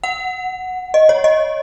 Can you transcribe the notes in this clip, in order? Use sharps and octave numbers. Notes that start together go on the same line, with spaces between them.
F#5
D#5
C#5
D#5